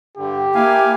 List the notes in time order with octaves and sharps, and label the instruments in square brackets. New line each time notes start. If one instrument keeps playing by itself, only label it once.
[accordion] G2 D3 [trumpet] G4
[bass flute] A#3 [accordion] E4 F5 G#5